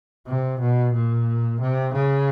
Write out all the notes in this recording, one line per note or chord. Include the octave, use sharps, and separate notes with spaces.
C3
B2
A#2
C3
C#3